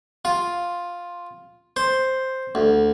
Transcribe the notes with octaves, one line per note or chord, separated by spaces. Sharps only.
F4
C5
D2